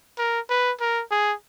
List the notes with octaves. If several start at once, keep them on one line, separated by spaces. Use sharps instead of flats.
A#4
B4
A#4
G#4